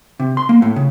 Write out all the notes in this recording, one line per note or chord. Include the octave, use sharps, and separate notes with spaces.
C3
C6
A#3
A2
C#3